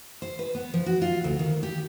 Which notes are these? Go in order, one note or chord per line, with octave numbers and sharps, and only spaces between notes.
C5
B4
B3
F3
F#4
F4
D2
D#3
G4